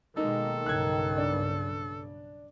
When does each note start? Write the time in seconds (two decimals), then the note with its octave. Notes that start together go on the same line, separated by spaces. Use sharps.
0.17 B2 D#3 G#3 A#3 D#4 A4
0.66 B1 G2 C#3 F#6 G#6
1.17 D4